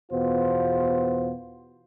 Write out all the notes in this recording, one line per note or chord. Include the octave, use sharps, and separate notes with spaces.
E2 B2 B3 F4 C5